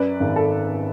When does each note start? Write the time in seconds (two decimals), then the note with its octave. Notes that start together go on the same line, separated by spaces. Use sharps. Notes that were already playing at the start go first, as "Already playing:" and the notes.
Already playing: F#2 B4 D5
0.20 G#1
0.36 A4